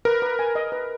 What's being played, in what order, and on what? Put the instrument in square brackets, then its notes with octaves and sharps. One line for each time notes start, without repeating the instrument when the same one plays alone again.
[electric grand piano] A#4 [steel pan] B4
[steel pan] B4
G#5
D#5
B4